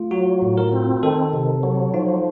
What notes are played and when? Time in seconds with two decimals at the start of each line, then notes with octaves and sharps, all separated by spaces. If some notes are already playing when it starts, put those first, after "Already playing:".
Already playing: A3 F4
0.11 F#3 F#4
0.42 A2
0.57 A#4
0.73 C4
1.03 D#3 A4
1.33 C3
1.63 F#3
1.94 F3 D#4